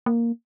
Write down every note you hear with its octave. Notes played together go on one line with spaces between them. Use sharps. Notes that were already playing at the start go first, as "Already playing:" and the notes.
A#3